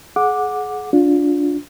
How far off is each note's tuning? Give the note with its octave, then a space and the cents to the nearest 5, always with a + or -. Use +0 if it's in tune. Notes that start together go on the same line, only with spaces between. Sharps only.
G#4 +30 F#5 -15 D6 +0
D4 -15 F4 +25